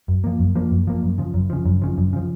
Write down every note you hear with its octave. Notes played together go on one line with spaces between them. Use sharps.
F#2
F3 A#3
F#2
F3 A#3
F#2
F3 A#3
F#2
C#3 F3
F#2
C#3 F3
F#2
C#3 F3
F#2
C#3 F3